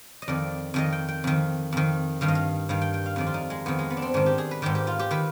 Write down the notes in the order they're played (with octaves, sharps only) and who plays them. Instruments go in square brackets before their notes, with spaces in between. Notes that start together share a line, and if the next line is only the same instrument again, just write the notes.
[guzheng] D#5
F2 D#3 D5
F2 D#3 D#5
G5
G5
F2 D#3
F2 D#3
G2 D#3 F5
D#5
F5
G2 D#3 F5
G5
G5
F5
F2 D#3 D5
F4
D#4
G#3
F2 D#3 B3
G#3
B3
D4
C4
G#2 D#3 D4
G4
G#4
B4
G#2 D#3 G4
G4
F4
G4
D#3 B4